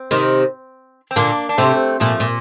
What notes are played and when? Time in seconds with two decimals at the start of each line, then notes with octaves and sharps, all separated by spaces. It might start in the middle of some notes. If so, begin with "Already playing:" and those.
Already playing: C4
0.11 C3 D#3
1.11 C4
1.16 A#2 D3 A#3 D4
1.49 D4
1.58 C3 A3 C4
2.00 A#2 F3 A3
2.20 A#2